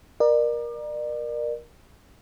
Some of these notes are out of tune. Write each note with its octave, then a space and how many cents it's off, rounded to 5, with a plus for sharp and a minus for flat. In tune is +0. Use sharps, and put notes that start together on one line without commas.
A#4 +20 D5 +35